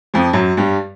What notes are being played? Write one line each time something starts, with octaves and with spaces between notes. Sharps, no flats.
F2 F3
F#2 F#3
G2 G3